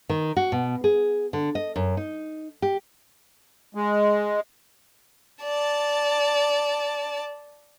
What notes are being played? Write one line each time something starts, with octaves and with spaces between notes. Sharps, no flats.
D#3
F#4
B2
G#4
D3
D#5
F#2
D#4
G4
G#3
D5 A5